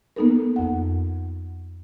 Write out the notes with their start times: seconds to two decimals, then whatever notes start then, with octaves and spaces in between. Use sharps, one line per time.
0.16 A#3 B3 D#4 A4 A#4
0.56 F2 F#5